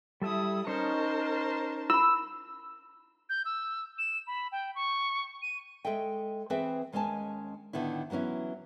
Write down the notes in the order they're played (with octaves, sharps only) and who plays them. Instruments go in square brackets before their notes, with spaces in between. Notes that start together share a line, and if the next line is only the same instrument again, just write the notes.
[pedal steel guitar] G3 A4 E5 [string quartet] E4 D#6
[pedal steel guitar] C#4 D#4 C#5 [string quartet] A#4 C5 A5
[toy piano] E4 B5 [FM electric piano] E6
[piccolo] G6
E6
E7
B5
G5
C#6
D#7
[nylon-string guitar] G#3 A4 D#5 E5 G5
E3 C4 G#4 B4 E5 G5
D#2 G#3 C#4 D#5 G#5 A5
A2 D3 D#3 B3 E4
E3 F#3 B3 C#4 E4